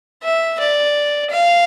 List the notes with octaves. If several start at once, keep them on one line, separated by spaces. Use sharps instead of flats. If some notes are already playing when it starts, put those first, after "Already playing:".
E5
D5
F5